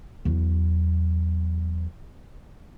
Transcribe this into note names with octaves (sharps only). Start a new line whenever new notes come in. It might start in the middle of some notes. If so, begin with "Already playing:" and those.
E2 F#3